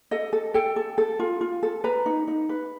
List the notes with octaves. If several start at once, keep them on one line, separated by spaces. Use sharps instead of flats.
A4 D#5
A4
A4 G5
A4
A4
F4
F4
A4
B4 A#5
D#4
D#4
B4